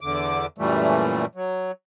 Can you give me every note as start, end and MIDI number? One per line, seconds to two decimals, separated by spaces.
0.01 0.46 40
0.01 0.46 50
0.01 0.46 86
0.58 1.25 42
0.58 1.25 46
0.58 1.25 52
0.58 1.25 55
0.58 1.25 57
1.35 1.71 54